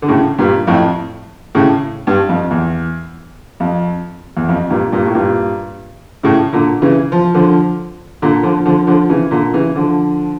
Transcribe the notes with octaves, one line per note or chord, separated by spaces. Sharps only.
D3
A2 C#3
G2 A#2
F2 A2
A2 C#3
G2
F2
E2
F2
E2
F2
G2 A#2
G2 A#2
A2
G2 A#2
A2 C#3
A#2 D3
C#3 E3
F3
D3 F3
A#2 D3
D3 F3
D3 F3
D3 F3
C#3 E3
A#2 D3
C#3 E3
D3 F3